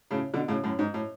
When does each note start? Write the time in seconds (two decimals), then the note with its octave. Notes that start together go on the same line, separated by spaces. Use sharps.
0.11 A2 C#3
0.34 B2 D3
0.48 A2 C#3
0.64 F#2 A2
0.79 G#2
0.94 A2